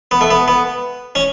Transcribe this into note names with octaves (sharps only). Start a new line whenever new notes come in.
B3
A3
B3
B3
C#4